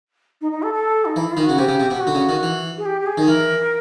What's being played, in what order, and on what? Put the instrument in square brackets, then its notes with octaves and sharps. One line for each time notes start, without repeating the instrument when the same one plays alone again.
[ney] D#4
D#4
A4
A4
D#4
[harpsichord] E3 [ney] E4
[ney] F4
[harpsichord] D#3
[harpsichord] C#3 [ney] F#4
[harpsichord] C3 [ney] G4
[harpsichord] C#3
C3
B2
[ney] G4
F#4
[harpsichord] D3
C#3
D#3
E3
[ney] G#4
G4
G4
G#4
[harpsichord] D#3
[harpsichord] E3 [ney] A#4